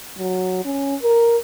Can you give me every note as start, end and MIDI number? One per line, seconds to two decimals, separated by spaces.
0.18 0.64 54
0.65 0.95 61
1.02 1.37 70